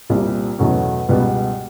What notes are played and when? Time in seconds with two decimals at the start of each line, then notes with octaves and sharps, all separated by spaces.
0.10 C2 A#2 G3 C4
0.59 E2 B2 F#3 A3 C#4
1.09 C#2 B2 G3 B3